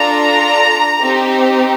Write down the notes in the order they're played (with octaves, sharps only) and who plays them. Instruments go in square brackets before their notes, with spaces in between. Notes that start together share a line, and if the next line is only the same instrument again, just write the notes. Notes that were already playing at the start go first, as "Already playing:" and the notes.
Already playing: [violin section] D4 F4 A4 A#5
C4 D#4 G4